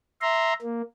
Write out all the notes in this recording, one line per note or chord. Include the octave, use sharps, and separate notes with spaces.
E5 A#5 C6
A#3